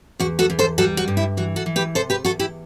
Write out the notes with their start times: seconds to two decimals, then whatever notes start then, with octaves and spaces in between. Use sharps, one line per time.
0.20 E2 F#4
0.39 F#4 A4
0.50 E2
0.59 A4 C5
0.78 G3 F#4 A4
0.97 F#4
1.08 G2
1.17 E4
1.37 E3 F#4
1.56 F#4 A4
1.66 E3
1.76 G4 B4
1.95 C3 A4 C5
2.10 G4 B4
2.25 E2 F#4 A4
2.39 E4 G4